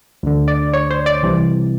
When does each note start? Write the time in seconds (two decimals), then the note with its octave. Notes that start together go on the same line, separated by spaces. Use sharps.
0.23 D2 D3
0.48 D5
0.74 C#5
0.91 C5
1.06 D5
1.23 C2 C3 E3